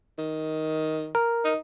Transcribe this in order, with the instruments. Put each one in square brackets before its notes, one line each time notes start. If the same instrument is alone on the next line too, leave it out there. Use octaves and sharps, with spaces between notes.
[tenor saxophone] D#3
[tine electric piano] A#4
[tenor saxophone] D#4